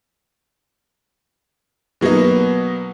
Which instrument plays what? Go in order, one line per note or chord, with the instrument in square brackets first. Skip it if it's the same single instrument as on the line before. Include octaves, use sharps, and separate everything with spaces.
[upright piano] B2 F#3 A#3 B3 D#4